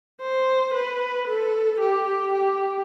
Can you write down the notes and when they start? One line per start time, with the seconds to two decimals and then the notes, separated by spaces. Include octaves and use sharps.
0.21 C5
0.74 B4
1.28 A4
1.80 G4
2.33 G4